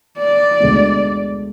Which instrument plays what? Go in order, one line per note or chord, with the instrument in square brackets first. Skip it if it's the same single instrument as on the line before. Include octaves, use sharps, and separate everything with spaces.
[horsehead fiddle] D5
[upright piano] D2 D3 G#3 B3